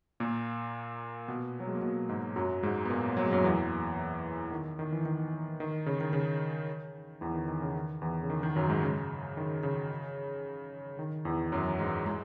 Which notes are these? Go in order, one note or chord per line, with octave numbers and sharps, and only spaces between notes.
A#2 A#3
B2 B3
F#3
G#3
A#3
B2 B3
G#2 G#3
F#2 F#3
G#2 G#3
B3
A#2 A#3
F#3
G#3
F#2 F#3
E2 E3
D#3
D#3
E3
D#3
D#3
C#3
D#3
C#3
E2 E3
D#3
D#3
C#3
D#3
E2 E3
C#3
D#3
D#3
F#2 F#3
G#2 G#3
C#3
D#3
C#3
D#3
E2 E3
F#2 F#3
G#2 G#3
G#3